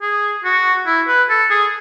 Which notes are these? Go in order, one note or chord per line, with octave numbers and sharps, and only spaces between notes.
G#4
F#4
E4
B4
A4
G#4